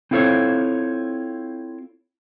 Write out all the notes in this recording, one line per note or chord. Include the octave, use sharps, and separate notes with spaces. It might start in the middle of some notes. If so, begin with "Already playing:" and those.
C4 E4 F4 A4 C5 C#5